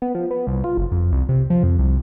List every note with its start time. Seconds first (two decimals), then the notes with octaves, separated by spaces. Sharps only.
0.02 B3
0.15 F3
0.31 B3
0.47 C2
0.64 F4
0.77 F#1
0.92 F2
1.12 C2
1.29 C3
1.50 F3
1.63 F2
1.79 C2